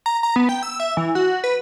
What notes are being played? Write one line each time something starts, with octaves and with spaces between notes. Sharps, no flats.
A#5
A#5
B3
G5
E6
E5
E3
F#4
B4